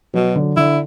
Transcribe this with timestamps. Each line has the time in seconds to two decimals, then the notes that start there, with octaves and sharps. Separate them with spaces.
0.14 B2 F#3
0.36 D3
0.57 D3 E4